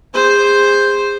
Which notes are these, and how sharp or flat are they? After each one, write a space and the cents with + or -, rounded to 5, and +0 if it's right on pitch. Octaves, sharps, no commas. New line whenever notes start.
G#4 -30 C5 +0